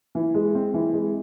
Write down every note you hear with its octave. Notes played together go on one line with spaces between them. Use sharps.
E3
G#3
C4
E3
G#3